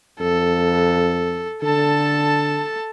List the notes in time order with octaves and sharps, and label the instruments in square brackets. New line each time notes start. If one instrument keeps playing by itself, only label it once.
[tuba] F2 [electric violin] A4
[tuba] D3 [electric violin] A4 A5